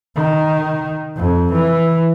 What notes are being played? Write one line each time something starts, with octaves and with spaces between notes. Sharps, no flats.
D#3
F2
E3